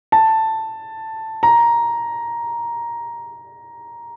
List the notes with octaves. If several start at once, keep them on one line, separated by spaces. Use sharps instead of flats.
A5
A#5